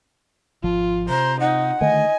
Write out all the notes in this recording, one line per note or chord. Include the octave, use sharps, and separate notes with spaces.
G#1 F3 F4
C3 C5 A#5
D#4 F#5
D3 D#3 A3 D#5 G#5